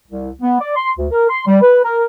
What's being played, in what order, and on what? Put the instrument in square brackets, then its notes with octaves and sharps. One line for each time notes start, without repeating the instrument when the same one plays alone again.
[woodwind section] C2
B3
D5
C6
D2
A#4
C6
G3
B4
A#4